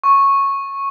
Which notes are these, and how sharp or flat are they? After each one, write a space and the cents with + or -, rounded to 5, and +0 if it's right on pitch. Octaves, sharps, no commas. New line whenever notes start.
C#6 -10